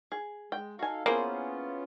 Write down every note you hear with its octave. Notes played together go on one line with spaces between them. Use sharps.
G#4
G#3 G5
D#4 F#4 A4 F5 G#5
A#3 B3 C#4 E4 F4 G#4 C5